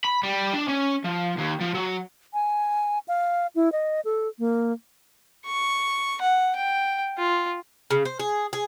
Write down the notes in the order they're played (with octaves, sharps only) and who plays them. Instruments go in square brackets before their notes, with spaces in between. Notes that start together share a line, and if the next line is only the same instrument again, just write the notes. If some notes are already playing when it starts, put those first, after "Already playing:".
[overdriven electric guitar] B5
G3
D4
C#4
F3
D#2
F3
F#3
[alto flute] G#5
F5
E4
D#5
A4
A#3
[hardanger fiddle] C#6
F#5
G5
F4
[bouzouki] C#3
C5
G#4
G#4